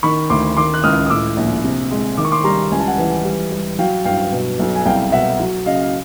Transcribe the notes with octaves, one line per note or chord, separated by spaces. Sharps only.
D#3 B5 C#6
D2 C6 D6
D#3 C6 D6
F#6
C#2 D#6 F6
D#6
A2 D6 E6
A#1
C3
G#3
D#3 D6
C#6
C6 D6
G3 A#5 C6
C#2 G#5
A5
F#5 G#5
E3
G3
G3
F#3 F5 G5
G2 F5 G5
B2
B1
G#5
C2 F5 G5
B2 E5 F#5
F#3
C#3 D#5 F5
F5